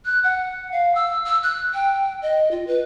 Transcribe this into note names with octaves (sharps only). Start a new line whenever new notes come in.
F#6
F#5
F5
E6
E6
F#6
G5
D#5
F4
B4